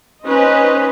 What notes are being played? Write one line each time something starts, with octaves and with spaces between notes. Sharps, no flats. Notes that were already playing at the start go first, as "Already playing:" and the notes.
C#4 D#4 B4 C5 D#5